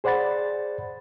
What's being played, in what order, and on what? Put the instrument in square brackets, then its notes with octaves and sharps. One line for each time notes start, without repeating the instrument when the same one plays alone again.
[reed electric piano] G#4 C5 D5 F#5 B5 A6